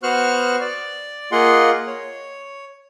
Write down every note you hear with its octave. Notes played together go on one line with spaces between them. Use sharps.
B3 F#4 C5 C#6 F6 F#6
D5
A#3 F4 G#4 D#5 F#5 C6
C#5